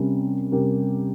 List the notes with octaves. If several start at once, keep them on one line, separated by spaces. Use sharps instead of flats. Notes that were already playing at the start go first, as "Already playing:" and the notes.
Already playing: C3 G3 C#4 A#4
C3 G3 C#4 G4 A#4